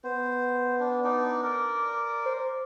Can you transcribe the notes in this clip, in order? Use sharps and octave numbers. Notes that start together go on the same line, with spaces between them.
B3 C5
D4
D4 D#4 D5
A#4 D5
C5